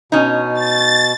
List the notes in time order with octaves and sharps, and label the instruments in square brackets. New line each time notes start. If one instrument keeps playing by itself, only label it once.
[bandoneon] B2 [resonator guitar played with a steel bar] C#4 D#4
[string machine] A6